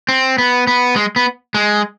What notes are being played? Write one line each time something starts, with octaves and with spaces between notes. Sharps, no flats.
C4
B3
B3
G#3
B3
G#3